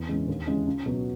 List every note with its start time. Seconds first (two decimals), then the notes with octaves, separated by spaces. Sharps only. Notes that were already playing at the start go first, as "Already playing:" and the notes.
Already playing: E2
0.09 C#3 E3 G#3 C#4
0.28 D#2
0.47 C#3 E3 G#3 C#4
0.67 C#2
0.86 B2 F#3 B3